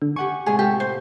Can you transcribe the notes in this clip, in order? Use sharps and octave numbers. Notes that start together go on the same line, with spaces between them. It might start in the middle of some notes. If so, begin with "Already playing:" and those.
D3
G4 F#5 G#5 C#6
A2 C3 G#3 G#4
F4 G4 A4
C5